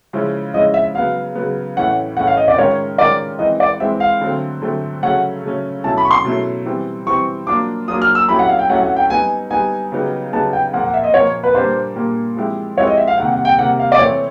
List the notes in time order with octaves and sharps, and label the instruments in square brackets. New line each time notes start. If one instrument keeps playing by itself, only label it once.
[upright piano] C#3 F3 G#3 C#4 E4
[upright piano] C#3 F3 G#3 C#4 E4 [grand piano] D#5
[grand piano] E5
[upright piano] C#3 F#3 B3 [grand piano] F5
[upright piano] C#3 F#3 B3
[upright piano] A2 E3 A3 C#4 [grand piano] F#5
[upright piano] A2 E3 A3 C#4 [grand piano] F#5
[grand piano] F5
D#5
D5
[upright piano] D#3 G#3 C#4 F4 A#4 [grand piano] C#5
[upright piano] D#3 G#3 C#4 F4 A#4 [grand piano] D5
[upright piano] E3 G#3 C4 [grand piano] D#5
[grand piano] D5
[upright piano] E3 G#3 C4 [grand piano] E5
[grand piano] F5
[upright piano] D3 F#3 A3 C4
D3 F#3 A3 C4
[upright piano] C#3 F#3 A3 C#4 [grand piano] F#5
[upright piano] C#3 F#3 A3 C#4
[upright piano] B2 F#3 A3 C#4 E4 [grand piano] A5
[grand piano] B5
C#6
C6
[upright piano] B2 F#3 A3 C#4 E4
E3 G3 C4
[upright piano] E3 G3 C4 [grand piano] C#6
[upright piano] F#3 A#3 D4 F4 [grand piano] D6
[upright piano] F#3 A#3 D4 F4 [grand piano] D#6
[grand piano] F6
E6
[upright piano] F#3 A3 C#4 E4 G4 [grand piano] B5
[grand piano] F#5
F5
G5
[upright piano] F#3 A3 C#4 E4 G4 [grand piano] F#5
[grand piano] F#5
G5
[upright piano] G3 B3 D#4 [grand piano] G#5
[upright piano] G3 B3 D#4 [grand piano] G#5
[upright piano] C#3 F#3 B3 D#4 G4
[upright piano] C#3 F#3 B3 D#4 G4 [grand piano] A5
[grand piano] G5
[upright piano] A#2 F3 A#3 [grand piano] F#5
[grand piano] F#5
E5
D#5
[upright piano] A#2 F3 A#3 [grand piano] C#5
[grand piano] B4
[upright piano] A#2 G3 A#3 D4 [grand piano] C5
[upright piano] A#2 G3 A#3 D4
F3 G#3 C4 E4 G4
[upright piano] F3 G#3 C4 E4 G4 [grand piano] C#5
[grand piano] D#5
E5
F5
[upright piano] C3 D#3 G3 A#3 [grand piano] F#5
[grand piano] F#5
G5
[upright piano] C3 D#3 G3 A#3 [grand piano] F#5
[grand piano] F5
D5
[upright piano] E3 A3 C4 E4 [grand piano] C#5